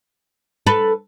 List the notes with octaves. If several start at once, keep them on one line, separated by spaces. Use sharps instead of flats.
A4 B4